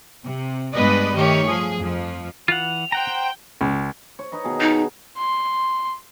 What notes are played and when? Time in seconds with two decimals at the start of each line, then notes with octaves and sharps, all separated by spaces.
0.25 C3
0.73 G2 G#3 B3 B4 D5 D#5
1.16 D#3 A3 G4 C#5
1.45 F3 G#4
1.78 F2 F3
2.48 E3 F4 F#5 F7
2.92 C5 F#5 G5 A#5
3.61 C#2
4.19 C#5
4.32 D#4 B4 D#5
4.44 B2 D#3 G#4
4.61 D#4
5.18 C6